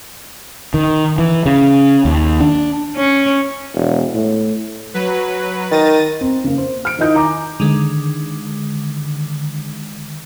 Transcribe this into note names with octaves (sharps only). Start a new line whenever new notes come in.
D#3
E3
C#3
D#2
D4
C#4
E1
A2
F#3 B4
D#3 A6 A#6 D#7
C4
C#3 A#3
C5
F6 D7
D#3 E4 F4 D#5 G6
G#5 A#5 D6
D3 D#3 G#3